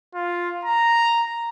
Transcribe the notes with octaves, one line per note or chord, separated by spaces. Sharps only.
F4
A#5